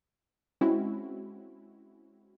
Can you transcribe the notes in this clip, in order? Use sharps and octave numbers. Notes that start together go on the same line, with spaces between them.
G#3 C4 C#4 E4 F#4